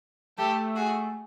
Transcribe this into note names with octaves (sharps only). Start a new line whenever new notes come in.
A3 G4 A4
F#4 G#4